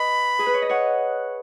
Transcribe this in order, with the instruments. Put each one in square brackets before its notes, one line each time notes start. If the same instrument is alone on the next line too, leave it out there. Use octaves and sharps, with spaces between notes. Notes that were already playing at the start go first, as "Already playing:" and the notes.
Already playing: [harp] B4 D#5 [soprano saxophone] B5
[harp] G#4
B4
C#5
D#5
C#5 F#5